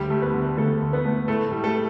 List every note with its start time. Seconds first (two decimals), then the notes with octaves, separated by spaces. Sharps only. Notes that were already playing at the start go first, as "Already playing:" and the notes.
Already playing: D2 G3 G4
0.10 A3
0.22 B3 B4
0.34 D3
0.57 D2 A3 A4
0.82 D2
0.93 B3 B4
1.05 A3
1.28 A2 A3 A4
1.52 G3
1.64 A3 A4